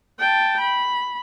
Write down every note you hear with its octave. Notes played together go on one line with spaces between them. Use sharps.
G5 A5
B5